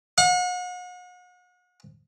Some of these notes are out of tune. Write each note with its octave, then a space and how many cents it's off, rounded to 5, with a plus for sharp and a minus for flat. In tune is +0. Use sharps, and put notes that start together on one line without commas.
F#5 -40